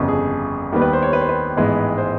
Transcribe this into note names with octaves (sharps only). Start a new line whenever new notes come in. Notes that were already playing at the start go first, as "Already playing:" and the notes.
Already playing: G1 F2 C#3 A4
G#4
D#2 D#3 G3 B3
B4
C5
C#5
B4
C5
B4
A1 G#2 E3 G#3 B3
C5